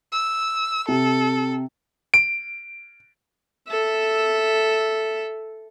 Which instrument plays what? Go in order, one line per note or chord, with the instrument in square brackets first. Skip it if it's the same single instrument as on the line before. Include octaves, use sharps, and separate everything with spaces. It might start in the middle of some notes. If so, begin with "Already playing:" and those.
[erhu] E6
[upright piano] C3 [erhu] A4
[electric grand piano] D7
[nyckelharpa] A4 E5